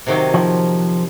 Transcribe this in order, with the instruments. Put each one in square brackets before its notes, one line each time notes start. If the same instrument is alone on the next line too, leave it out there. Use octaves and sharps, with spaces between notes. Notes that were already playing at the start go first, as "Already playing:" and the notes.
[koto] C3 D#3 F#3
[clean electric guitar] F3